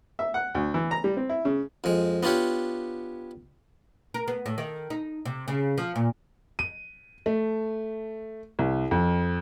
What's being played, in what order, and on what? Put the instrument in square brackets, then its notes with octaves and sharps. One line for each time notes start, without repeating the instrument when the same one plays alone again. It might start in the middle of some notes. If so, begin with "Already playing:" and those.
[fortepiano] E5
F#5
D2
E3
A#5
G3
C4
E4
C#3
[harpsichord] F2 G#3
B3 D4 F4 G4 C#5
[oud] A#4
B3
A2
D#3
D#4
C3
C#3
F3
A#2
[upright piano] D#7
A3
C2
F2